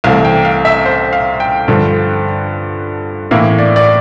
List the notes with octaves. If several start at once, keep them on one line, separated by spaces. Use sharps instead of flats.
C2 C3 E3 A3 F5
G5
F5
E5
C5
F5
G5
G2 D3 F3
A2 E3 A#3 F5
D5
D5